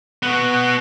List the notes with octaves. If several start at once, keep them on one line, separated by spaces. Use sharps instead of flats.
B3 F#4